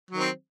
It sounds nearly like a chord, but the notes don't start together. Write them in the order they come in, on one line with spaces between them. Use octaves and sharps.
F#3 D#3 C4